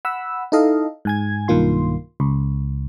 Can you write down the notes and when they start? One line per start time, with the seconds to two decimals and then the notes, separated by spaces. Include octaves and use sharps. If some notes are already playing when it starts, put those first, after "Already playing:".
0.05 F#5 B5 E6
0.52 D#4 E4 A4 D#5 F5
1.05 G#2 G#5 G#6
1.48 B1 G2 D#3 A#3 F4 C6
2.20 C#2